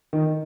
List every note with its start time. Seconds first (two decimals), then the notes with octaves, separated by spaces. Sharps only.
0.13 D#3